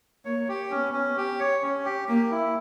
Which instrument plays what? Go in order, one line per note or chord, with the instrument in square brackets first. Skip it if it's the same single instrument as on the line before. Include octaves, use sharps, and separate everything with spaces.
[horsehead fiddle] A#3 [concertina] C#5
[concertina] G4
[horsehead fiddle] B3 [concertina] C#4
[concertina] C#4
G4
C#5
C#4
G4
[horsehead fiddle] A#3 [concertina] G4
[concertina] E4